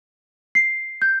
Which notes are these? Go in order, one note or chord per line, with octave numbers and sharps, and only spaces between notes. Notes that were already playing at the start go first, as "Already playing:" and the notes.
C7
G6